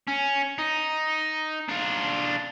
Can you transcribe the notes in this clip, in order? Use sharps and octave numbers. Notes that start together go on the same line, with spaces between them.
C#4
D#4
D4 F4